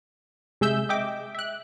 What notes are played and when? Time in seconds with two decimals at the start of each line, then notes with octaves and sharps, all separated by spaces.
0.61 C3 G#3 G#4 E5 E6 G6
0.89 D#5 E5 G5 D6
1.35 E5 F#6